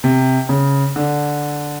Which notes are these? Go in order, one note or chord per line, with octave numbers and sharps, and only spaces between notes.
C3
C#3
D3